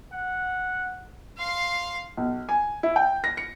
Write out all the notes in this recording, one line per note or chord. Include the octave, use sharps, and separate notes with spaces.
F#5
F5 C6
B1
G#5
E4
G5
A#6
C#7